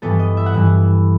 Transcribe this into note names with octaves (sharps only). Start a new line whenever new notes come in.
G2 E3 B3 A4
D#5
E5
F#5
G2 E3 B3 E5